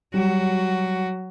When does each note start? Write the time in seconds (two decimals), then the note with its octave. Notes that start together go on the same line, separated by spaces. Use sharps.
0.14 F#3 G3 F#4